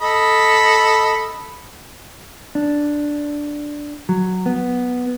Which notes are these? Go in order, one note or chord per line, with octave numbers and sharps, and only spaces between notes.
A4 D#5 B5
D4
F#3
B3